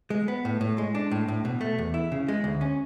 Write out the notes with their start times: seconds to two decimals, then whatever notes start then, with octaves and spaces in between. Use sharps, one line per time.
0.10 G#3
0.28 B3
0.45 A2
0.61 A2
0.78 G#3
0.95 D4
1.11 A2
1.28 A2
1.45 B2
1.61 A3
1.78 E2
1.94 E4
2.12 C#3
2.28 G#3
2.44 D2
2.61 C#4